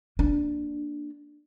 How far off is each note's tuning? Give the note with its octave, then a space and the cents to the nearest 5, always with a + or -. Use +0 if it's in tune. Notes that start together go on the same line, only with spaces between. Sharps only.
A#3 +0 D4 +0